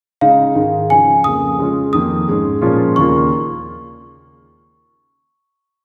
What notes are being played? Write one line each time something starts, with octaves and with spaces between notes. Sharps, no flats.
C#3 G#3 D#4 F5
G#2 D#3 G#3 D#4
C#3 F3 C#4 F4 G#5
F2 C#3 A#3 D#6
C#3 G#3 C#4 F4
F2 D#3 A#3 D#6
G#2 G#3 C#4
A#2 F3 G#3 C#4 F4
D#2 C#3 A#3 F4 C#6